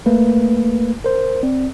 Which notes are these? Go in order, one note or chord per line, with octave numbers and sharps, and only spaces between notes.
A3 A#3 B4
A#4 C5
C4 D5